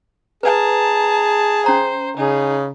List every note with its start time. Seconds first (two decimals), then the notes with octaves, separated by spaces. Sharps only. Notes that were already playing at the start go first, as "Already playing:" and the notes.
0.43 G#4 B4 A5 A#5
1.66 C#4 C5 A#5
2.17 C#3 D#4 G#4